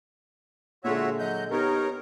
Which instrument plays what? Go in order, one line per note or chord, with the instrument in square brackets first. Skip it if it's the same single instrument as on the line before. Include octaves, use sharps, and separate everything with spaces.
[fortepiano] A#2 D3 G#3 [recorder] F4 [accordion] F#4 C#5 E5
[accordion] F#3 G6 [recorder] D#5
[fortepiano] B3 [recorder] D#4 [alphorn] G4 [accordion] A#4 C#5